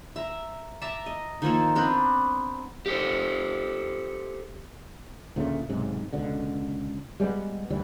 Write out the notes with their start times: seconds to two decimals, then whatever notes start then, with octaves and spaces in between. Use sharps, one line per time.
0.16 E5 A#5
0.81 E5 A5 A#5 D6
1.06 D#5
1.42 D#3 F3 A#3 A4
1.75 B3 C4 D4 A#4
2.86 G4 A4 C5
5.36 D2 A#2 C#3 A3
5.69 B1 G#2 C3
6.13 C#2 B2 D3
7.20 G3 G#3 A#3 B3
7.70 D2 E3 G3